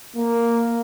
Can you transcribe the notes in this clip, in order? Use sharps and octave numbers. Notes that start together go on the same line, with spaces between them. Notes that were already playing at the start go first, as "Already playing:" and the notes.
A#3